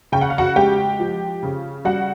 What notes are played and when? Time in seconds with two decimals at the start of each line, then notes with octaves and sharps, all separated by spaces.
0.12 C#3 G5
0.21 F#5
0.30 F5
0.38 F#4 F#5
0.56 G#3 G4 G5
1.00 F3
1.43 C#3
1.85 G3 F#4 F#5